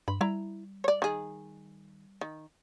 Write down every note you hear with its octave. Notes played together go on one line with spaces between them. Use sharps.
G2 B5
G3 E4 A#5
C#5 D5
D#3 G#4
D#3